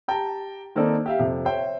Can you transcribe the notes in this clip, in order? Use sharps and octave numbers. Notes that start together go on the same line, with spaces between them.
G4 G5 A5 A#5
D#3 A#3 C4 D#4 A4 D5
G4 E5 F5
F2 C3
C5 C#5 E5 G5